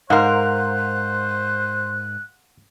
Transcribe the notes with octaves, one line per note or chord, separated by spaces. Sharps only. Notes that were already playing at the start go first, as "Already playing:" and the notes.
G#2 A#4 C5 F5 F#5 C6 F#6